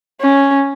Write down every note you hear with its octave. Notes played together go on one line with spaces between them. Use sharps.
C#4